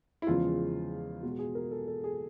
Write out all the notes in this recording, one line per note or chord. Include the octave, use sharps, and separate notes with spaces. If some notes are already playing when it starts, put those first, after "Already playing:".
E4
E2 C#3 F3 G#3 F4
B2 G#3 F#4
G#4
A#4
A4
A4
G#4